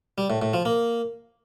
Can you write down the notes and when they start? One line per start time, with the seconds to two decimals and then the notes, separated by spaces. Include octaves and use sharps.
0.18 G3
0.30 A2
0.42 A2
0.53 F3
0.65 A#3